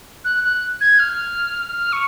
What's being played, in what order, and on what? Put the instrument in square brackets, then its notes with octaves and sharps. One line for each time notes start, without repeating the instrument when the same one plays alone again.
[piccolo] F#6
F#6
G#6
F6
F6
C#6